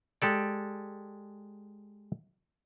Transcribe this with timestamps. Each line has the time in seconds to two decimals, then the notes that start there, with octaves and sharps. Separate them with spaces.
0.22 G#3 G4 A4 D5